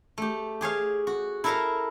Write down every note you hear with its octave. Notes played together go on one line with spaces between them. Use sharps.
A3 G4
G4 G#4 C#5 F5
F#4
E4 A4 A#4 E5 F5 A#5